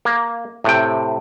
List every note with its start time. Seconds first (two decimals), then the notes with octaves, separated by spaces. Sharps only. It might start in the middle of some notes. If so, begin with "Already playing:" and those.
0.05 A#3
0.64 A2 C3 G5